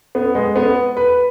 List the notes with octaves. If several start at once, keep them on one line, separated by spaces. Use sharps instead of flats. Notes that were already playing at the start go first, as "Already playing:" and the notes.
B3
G#3
B3
B4